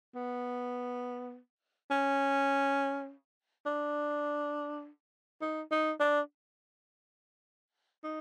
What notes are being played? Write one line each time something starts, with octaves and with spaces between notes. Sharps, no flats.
B3
C#4
D4
D#4
D#4
D4
D#4